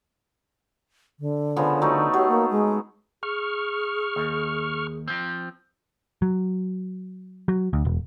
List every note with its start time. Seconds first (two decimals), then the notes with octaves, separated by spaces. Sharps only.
1.20 D3
1.56 C#3 F3 B3
1.81 F#3 A3 D#4
2.13 F#3 G4
2.29 A#3
2.51 G#3
3.23 G#4 C#6 F6
4.16 D#2
5.08 F3 C4
6.22 F#3
7.48 F#3
7.73 D2
7.85 E1